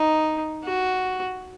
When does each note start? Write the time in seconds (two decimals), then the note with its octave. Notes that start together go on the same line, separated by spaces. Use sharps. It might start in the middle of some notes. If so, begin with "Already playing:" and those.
Already playing: D#4
0.65 F#4